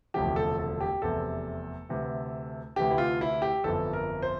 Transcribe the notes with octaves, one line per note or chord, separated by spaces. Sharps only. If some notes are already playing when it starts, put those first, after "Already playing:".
E1 D2 C3 F3 G4
A4
A4
G4
F1 E2 C3 E3 A4
D2 C3 E3
D2 C3 E3 G4
E4
F4
E4
G4
G1 F2 E3 A4
A#4
C5